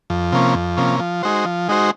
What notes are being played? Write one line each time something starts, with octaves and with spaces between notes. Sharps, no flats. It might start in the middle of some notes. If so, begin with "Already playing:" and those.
F2
C3 F3 A#3 C#4
F2
C3 F3 A#3 C#4
F3
G#3 D#4 F#4 C5
F3
G#3 D#4 F#4 C5